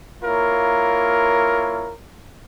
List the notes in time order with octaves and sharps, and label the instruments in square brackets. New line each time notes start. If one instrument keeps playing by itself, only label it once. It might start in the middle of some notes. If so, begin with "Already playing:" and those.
[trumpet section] A#3 E4 F4 A#4 C#5